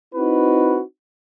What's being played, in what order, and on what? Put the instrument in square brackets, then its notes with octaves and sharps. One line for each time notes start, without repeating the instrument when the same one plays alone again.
[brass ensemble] C4 D#4 E4 F#4 B4